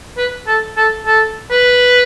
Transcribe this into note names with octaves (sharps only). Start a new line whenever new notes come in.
B4
A4
A4
A4
B4